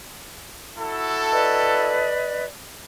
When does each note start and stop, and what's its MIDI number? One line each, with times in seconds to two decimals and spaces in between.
0.79 2.11 64
0.79 2.11 66
0.79 2.11 69
1.32 2.45 71
1.32 2.45 74
1.32 2.45 75